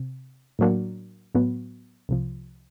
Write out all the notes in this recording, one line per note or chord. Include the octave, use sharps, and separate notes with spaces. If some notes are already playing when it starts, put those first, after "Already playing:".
Already playing: C3
A2 F#3 A#3 D4 F#4
A2 F#3 B3
C2 C3 F3